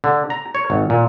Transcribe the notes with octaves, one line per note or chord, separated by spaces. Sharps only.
D3
A#5
C#5
G#1
A#2